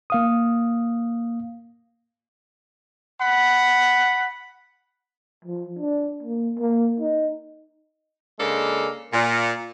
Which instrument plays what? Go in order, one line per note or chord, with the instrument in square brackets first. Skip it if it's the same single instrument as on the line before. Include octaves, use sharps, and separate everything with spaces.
[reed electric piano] A#3 F5 D#6
[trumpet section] F#5 B5
[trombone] F3
D4
A#3
A#3
D#4
[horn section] C#3 G#3 A#3 D4 A4
A#2